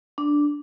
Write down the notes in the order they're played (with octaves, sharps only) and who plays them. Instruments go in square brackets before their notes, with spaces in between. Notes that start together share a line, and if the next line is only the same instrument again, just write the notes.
[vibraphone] D4